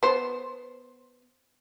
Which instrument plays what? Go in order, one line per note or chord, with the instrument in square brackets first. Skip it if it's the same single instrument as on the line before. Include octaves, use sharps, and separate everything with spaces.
[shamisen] B3 C5